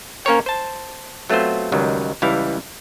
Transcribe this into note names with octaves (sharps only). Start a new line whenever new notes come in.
A#3 C#4 A#4 C5 C#5 G5
C5 A5
F#3 A3 B3 C4 F4 C5
C#2 D#3 F#3 G3
C#2 E3 G3 E4 F5 G5